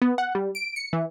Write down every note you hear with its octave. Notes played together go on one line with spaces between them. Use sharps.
B3
F#5
G3
D7
C#7
E3